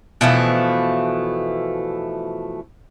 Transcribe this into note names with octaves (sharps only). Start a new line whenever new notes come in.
B2 E3 F3 A3